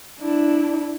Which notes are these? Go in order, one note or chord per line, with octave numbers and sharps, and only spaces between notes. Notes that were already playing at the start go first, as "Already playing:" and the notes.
D4 E4